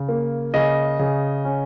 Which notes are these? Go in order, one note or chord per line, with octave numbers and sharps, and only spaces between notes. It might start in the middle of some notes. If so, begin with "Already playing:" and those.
Already playing: C#3
A#3
C#3 D#5
C#3
C#4